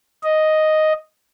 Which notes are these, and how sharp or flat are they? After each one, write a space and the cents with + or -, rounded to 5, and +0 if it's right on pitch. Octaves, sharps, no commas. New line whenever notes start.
D#5 +0